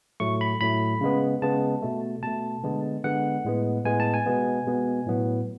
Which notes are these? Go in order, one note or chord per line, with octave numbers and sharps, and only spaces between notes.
A2 F#3 A3 C#6
B5
A2 F#3 A3 B5
C#3 G#3 B3
C#3 G#3 B3 A5
B2 A3
B2 A3 A5
D3 G#3 B3
D3 G#3 B3 F#5
A2 G#3 B3
A2 G#3 B3 G#5
A5
G#5
B2 G#3 B3
B2 G#3 B3
A2 F#3 B3